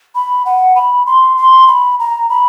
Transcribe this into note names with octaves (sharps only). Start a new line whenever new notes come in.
B5
F#5
B5
C6
C6
B5
A#5
B5